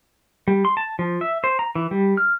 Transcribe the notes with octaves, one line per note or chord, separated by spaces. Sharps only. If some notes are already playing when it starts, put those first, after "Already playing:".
G3
C6
A5
F3
E5
C5
A#5
E3
G3
F6